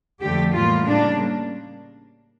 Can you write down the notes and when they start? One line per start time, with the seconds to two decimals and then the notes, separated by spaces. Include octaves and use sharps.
0.22 F2 D3 F3 A3 G4
0.54 A2 E3 G3 A#3 F4
0.87 C#3 G3 A#3 D4